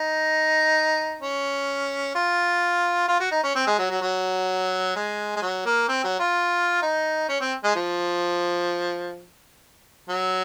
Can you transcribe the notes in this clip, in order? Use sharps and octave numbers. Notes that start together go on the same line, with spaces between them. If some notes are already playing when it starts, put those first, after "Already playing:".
Already playing: D#4
C#4
F4
F4
F#4
D#4
C#4
C4
G#3
F#3
F#3
F#3
G#3
G#3
F#3
A#3
C4
F#3
F4
D#4
C#4
C4
G#3
F3
F#3